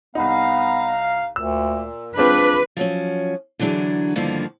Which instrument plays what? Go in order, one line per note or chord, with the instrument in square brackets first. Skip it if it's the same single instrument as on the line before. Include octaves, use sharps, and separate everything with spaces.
[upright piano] C2 D#4 [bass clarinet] B3 [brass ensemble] F5 A#5
[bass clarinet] D2 [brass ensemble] A#2 [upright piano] E6
[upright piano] G#3 C4 F4 [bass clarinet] D4 [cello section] B4
[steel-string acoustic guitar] F3 F#3 C#4
D3 E3 F#3 D4 G#4
G2 D3 D#3 F3 A#3 B3